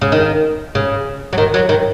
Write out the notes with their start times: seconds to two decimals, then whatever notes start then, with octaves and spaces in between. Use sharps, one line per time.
0.01 C#3
0.12 D#3
0.75 C#3
1.33 F#3
1.38 D#3
1.54 F#3
1.69 D#3